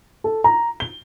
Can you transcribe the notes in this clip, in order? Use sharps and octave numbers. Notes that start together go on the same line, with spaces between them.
A4
A#5
G7